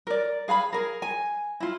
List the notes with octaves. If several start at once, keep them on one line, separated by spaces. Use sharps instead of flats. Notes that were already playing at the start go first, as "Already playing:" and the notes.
A#4 D5
G#4 F5 A#5 B5
G#4 A#4
G#5
E4 F4